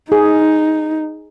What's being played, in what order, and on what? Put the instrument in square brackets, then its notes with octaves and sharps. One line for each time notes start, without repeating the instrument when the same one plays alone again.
[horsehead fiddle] D#4 [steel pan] G#4